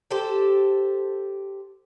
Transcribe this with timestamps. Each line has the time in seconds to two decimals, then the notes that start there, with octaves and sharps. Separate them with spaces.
0.11 G4 A4 C5